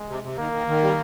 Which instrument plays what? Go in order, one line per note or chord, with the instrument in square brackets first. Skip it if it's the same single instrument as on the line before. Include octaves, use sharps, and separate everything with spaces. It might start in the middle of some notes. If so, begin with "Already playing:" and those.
Already playing: [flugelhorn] G#3
[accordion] C3
C3
[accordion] D#3 [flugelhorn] A#3
[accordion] D#3
D#3
G3